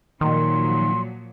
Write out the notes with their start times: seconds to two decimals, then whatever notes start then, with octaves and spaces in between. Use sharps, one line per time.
0.21 A#2 D#3 F3 F#3 C6